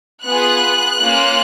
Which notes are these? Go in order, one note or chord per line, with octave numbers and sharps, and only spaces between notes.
B3 F4 G#4 F#6
A#3 C#4 F4